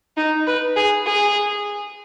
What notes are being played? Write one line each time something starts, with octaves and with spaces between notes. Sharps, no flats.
D#4
B4
G#4
G#4